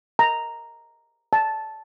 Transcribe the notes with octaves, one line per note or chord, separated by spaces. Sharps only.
A#5
A5